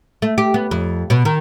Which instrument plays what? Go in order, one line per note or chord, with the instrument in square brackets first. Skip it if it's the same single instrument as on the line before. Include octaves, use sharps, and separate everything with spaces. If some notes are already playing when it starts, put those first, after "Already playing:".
[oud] A3
G4
B3
F2
B2
D#3